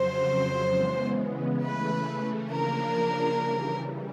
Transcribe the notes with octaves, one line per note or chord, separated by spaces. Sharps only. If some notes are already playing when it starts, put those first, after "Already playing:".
Already playing: F2 C#3 F#3 C5
C#3 E3 G#3 B3
C#3 E3 A3 B4
C#3 F3 A#3 D4 A#4
C#3 E3 G3